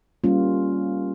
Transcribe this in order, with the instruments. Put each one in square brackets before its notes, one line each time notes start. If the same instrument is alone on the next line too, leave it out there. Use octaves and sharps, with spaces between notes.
[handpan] G3 A#3 C#4 F4